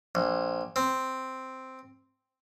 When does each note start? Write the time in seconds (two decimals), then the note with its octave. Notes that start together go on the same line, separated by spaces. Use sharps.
0.15 A#1
0.76 C4